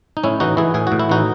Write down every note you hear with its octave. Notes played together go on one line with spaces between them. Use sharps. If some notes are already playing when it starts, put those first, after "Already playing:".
D#4
A2 C#4 E4
E3 D#4 F#4
E3 E4 G#4
A2 G#4
A2 F#4
E4
E3 D#4 F#4